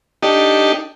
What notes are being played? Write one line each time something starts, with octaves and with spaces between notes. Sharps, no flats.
D4 D#4 G4 A4 D#5